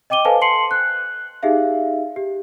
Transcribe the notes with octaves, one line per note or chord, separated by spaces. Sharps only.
D#5 G5 D6 D#7 G7
A4 B4 C5 F5 G#5 A5
A5 C6 C7 C#7 F#7
F#6
D#4 G4 G#4 E5 F5
G4